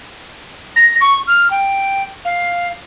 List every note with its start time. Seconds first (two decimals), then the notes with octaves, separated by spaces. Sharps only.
0.76 A#6
1.01 C#6
1.27 F6
1.51 G5
2.25 F5